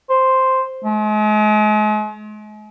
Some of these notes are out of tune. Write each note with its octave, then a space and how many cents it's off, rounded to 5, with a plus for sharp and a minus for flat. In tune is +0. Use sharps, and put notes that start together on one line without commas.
C5 +0
G#3 +40